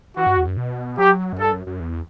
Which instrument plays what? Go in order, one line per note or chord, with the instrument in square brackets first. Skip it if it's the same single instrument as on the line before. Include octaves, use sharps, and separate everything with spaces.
[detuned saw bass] E3 [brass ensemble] F#4
[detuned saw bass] G2
E2
F#2
B2
[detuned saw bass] F#3 [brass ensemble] G4
[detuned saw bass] F#2
[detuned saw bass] G2 [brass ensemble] A4
[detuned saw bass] F#2
F#2
E2